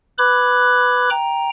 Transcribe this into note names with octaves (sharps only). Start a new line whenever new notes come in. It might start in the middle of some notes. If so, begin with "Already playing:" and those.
B4 B5 D6 F#6 G#6
G5 A#5